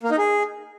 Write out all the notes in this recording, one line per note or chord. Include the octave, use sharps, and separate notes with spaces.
A#3
D#4
G#4